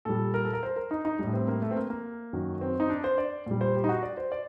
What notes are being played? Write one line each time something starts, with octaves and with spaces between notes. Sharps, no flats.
A#2 G3 A4
A#4
A4
A#4
C5
A#4
D#4
D#4
A2 G3 D4
C4
A#3
A3
C4
A#3
A#3
F#2 D#3 F#3
C4
D#4
D4
C5
D5
A#2 G3
C5
G4
D#4
F#4
D5
C5
D5